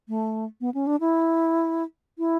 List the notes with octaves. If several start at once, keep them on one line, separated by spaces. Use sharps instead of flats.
A3
B3
C#4
D4
E4
E4